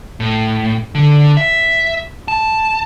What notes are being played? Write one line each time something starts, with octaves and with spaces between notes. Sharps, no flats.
A2
D3
E5
A5